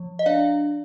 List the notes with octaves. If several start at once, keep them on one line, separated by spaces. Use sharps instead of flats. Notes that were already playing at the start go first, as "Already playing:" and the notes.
Already playing: F3
D#5
D4 D5 F5